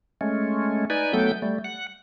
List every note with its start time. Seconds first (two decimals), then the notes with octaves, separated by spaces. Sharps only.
0.21 G#3 A3 C#4
0.90 D#4 B4 D5 G#5
1.13 F#3 A3 B3 A4 G5 G6
1.42 G3 A3
1.64 F#5